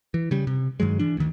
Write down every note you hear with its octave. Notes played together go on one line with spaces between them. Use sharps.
E3
C#3 G3
C3
G2 D#3 F#3 G#3
E3 D4
D2 D#3